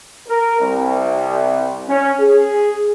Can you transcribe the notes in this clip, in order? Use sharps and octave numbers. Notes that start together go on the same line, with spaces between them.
A#4
C2
C#4
G#4